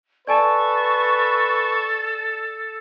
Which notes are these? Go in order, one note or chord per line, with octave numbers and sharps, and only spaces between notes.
A4 B4 D5 G#5 A5 C#6